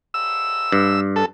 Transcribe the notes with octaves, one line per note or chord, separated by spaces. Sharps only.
E6
G2
A4